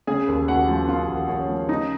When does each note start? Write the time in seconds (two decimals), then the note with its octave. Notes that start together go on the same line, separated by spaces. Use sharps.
0.07 C#3 G#4 G#5
0.28 D#2
0.48 D#2 F#4 F#5
0.68 F3
0.88 C#3 F4 F5
1.08 D#2
1.28 D#2 C#4 C#5
1.49 F3
1.69 C#3 D#4 D#5